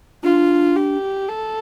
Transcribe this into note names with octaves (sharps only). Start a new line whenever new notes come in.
D4 F4
G4
A4